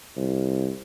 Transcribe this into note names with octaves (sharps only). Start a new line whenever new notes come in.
C2